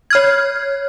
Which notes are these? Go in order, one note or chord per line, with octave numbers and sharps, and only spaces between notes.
C#5 F6 G#6